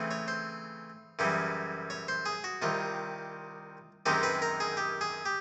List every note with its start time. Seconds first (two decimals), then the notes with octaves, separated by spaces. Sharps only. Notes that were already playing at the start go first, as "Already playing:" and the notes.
Already playing: C#3 E3 A3 C4
0.11 C#5
0.28 C5
1.19 F#2 C#3 E3 G3
1.90 C#5
2.08 C5
2.26 G#4
2.44 F#4
2.62 C2 C3 D#3 F4
4.06 F#2 D#3 G#3 C4 D#4 G4
4.23 B4
4.42 A#4
4.60 G#4
4.77 G4
5.01 G#4
5.25 G4